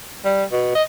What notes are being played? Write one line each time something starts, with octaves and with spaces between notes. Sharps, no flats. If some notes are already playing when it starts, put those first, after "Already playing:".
G3
B2
D#5